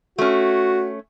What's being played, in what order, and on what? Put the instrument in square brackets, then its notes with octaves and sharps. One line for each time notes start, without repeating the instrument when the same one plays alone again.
[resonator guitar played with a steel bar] A3 C#4 [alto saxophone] F#4